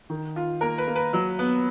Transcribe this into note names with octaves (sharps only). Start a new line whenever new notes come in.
D#3
F4
A#3 A#4
B4
A#3
B4
F#3
B3